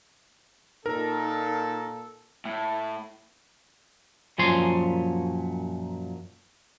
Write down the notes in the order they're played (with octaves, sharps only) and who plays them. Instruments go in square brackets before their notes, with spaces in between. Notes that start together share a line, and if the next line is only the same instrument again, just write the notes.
[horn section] A#2 A4 [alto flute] D#4 [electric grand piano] A#4
[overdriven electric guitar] A2
[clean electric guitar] F#2 A#2 F3 C#5 G#5 C6